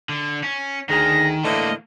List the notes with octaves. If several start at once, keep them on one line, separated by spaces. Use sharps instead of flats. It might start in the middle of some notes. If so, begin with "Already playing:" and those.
D3
C#4
D2 D#3 G#4 A#6
A2 D3 E3 A3 A#3 D#5